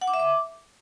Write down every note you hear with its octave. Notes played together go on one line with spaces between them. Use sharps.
F#5
D6
E5
D6